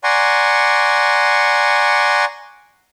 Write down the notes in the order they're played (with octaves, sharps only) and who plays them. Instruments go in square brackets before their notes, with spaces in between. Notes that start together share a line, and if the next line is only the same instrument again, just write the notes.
[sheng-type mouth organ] D5 F#5 G#5 A#5 C6 C#6